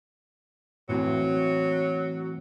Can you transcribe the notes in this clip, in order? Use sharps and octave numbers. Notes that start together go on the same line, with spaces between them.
A2 E3 F#3 C4